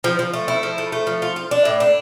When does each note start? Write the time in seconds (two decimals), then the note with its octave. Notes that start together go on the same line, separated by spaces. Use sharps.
0.04 F3
0.19 F3
0.34 A3
0.48 E4
0.63 F3
0.78 A3
0.92 A3
1.07 F3
1.22 F4
1.36 F4
1.51 D4
1.65 A2
1.80 D4